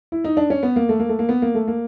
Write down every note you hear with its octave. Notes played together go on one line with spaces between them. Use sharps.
E4
D#4
D4
C#4
B3
A#3
A3
A#3
A3
A#3
B3
A#3
A3
A#3